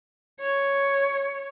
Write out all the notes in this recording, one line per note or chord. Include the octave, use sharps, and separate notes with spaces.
C#5